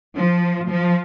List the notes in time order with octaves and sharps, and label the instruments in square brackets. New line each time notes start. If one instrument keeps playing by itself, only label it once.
[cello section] F3
F3